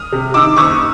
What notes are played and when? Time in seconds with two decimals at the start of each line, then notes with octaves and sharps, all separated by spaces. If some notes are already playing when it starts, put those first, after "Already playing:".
Already playing: D#6 F6
0.12 C3
0.34 D#3 D6 E6
0.56 F#1 C#6 D#6